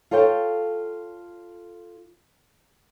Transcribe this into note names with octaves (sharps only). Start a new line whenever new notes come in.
F4 A4 C#5 F5 G5